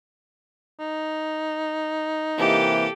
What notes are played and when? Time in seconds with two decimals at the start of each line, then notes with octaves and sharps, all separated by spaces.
0.80 D#4
2.38 C3 E3 A#3 G4 A4